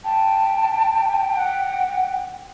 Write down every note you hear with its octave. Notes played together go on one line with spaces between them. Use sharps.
G5 A5
F#5